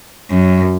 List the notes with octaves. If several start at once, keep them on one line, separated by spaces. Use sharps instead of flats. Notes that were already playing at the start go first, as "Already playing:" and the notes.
F#2